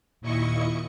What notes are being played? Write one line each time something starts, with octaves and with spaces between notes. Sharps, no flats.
D#2 A#2 E4 D#5 C#6 C#7